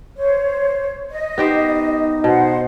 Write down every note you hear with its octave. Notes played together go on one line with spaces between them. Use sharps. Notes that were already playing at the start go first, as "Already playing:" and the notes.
C5 C#5
D#5
B3 D#4 G4 C5
B2 C5 F#5